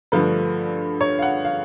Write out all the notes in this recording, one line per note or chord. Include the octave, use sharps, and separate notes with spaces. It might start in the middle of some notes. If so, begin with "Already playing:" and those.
G2 D3 F3 A3 B4
C#5
F5
F#5
F5